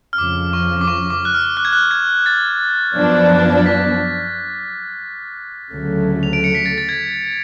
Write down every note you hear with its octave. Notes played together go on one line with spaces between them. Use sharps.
F6
F2 C#3 F3 D6
C#6
D6
C#6
D6
F#6
F6
F#6
G#6
F#6
G#6
A6
F#2 F3 B3 D4
A6
B6
D2 C#3 F#3 A3
F7
D7
C#7
B6
A6
A6
G#6